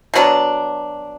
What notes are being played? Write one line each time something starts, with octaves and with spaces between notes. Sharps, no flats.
B2 F#3 B3 D4